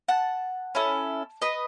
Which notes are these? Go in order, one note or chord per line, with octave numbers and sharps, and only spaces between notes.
F#5 A5
C#4 E4 A4
B4 D#5